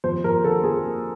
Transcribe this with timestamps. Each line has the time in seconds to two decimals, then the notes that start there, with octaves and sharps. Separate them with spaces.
0.04 F2 C5
0.24 F2 A#4
0.44 D3 A4
0.63 F2 G#4
0.84 A#3